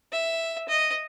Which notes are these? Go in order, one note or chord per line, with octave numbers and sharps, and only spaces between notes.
E5
D#5